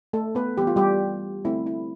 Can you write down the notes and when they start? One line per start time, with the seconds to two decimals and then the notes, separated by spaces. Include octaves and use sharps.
0.13 A3 A4
0.35 B3 B4
0.58 E3 G3 B3 G4
0.67 F4
0.76 G3 G4
1.45 D3 A3 C4 E4
1.67 E4